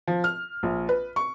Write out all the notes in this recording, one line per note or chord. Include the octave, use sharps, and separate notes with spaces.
F3
F6
A#1
B4
C#6